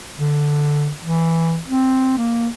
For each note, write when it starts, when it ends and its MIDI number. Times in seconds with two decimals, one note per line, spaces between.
0.19 0.91 50
1.04 1.59 52
1.68 2.18 60
2.18 2.48 58